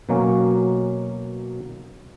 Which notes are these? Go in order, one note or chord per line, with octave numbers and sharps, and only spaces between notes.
B2 F#3 A#3 C#4